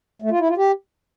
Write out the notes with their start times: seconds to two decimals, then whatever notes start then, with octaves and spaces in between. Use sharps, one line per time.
0.22 A3
0.31 F4
0.40 E4
0.48 F4
0.57 G4